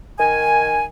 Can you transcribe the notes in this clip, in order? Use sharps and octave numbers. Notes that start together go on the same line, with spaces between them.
D#3 G#5